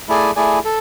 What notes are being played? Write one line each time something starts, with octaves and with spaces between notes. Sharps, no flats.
A3 E4 G#4 D5 G#5
A3 E4 G#4 D5 G#5
A4